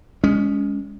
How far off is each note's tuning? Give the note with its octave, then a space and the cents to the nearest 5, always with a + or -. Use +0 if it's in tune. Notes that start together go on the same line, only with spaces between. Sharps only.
G#3 -10 C#4 +20